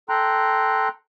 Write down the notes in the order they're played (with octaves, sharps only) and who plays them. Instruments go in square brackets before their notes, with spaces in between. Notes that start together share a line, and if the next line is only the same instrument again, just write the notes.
[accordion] A4 G5 A#5 C6 F#6